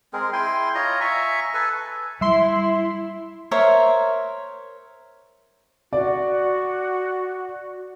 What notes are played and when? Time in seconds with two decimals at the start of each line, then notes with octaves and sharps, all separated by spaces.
0.13 G#3 C4 G#4 A#4
0.33 E4 G5 G#5 C6
0.75 F4 C#5 D#5 A#5
1.01 E5 G#5 A#5 C#6
1.54 A4 B4 G#5
2.21 G3 E4 E5 C6
3.51 A#4 C5 C#5 E5
5.93 F#4 D5